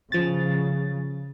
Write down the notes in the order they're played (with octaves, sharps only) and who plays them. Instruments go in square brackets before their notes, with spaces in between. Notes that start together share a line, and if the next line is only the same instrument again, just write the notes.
[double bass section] C#3 [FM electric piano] F3 A6